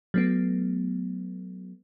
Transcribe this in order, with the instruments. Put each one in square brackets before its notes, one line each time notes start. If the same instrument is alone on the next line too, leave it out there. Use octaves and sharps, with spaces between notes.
[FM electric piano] F#3 A3 B3